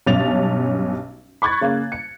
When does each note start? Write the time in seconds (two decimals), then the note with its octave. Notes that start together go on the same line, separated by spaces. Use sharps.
0.06 B1 G2 C#4 A6 F7
1.42 B5 C#6 F#6 G#6 A6
1.61 C#3 A#3
1.92 C#7